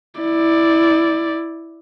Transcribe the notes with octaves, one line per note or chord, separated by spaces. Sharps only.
E4 D5